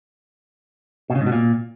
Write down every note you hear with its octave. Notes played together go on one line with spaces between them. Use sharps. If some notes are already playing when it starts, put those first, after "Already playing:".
B2
C#3
G#2
B2
A#2